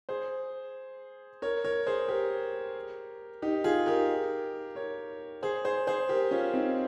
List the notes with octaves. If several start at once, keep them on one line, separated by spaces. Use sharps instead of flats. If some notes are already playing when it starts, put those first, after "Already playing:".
G#4 C5
A#4 C#5
A#4 C#5
G#4 C5
G4 A#4
D#4 G4
F4 G#4
G4 A#4
A#4 C#5
G#4 C5
G#4 C5
G#4 C5
G4 A#4
C#4 F4
C4 D#4